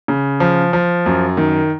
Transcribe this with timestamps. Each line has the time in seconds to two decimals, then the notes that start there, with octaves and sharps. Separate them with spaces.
0.08 C#3
0.40 F3
0.73 F3
1.06 F#2
1.37 D#3